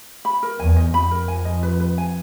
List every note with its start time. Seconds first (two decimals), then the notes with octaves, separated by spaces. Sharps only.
0.25 B5
0.43 A#4
0.59 E2 G#5
0.76 D#5
0.94 F2 B5
1.11 A#4
1.28 G#5
1.45 D#5
1.63 B4
1.80 B4
1.98 G#5